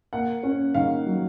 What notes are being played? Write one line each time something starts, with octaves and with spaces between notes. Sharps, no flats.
A#3 F#5
C#4
D#3 F5
F#3